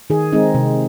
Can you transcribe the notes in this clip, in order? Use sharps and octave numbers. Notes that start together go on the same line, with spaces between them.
D#3 G#4
G#3 C4 D#4
C3